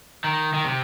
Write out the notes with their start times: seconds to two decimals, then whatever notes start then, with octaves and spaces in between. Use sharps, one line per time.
0.24 D#3
0.53 D#3
0.65 C3